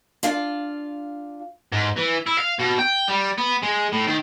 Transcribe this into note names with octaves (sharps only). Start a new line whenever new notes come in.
D4 F4 F5
G#2
E3
E4
F5
B2
G5
G3
B3
G#3
A2
D#3